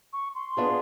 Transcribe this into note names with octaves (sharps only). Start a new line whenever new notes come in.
C#6
C6
B3 D4 F4 G#4